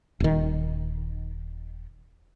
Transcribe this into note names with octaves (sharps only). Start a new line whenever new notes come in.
D#1 D#3